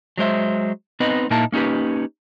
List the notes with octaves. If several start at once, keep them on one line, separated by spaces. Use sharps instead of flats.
F#3 G#3 C5 E5
B3 C4 D#4 B4 D#5
A#2 A#3 D#4 E4 A5
A#3 C#4 D#4 G4 B4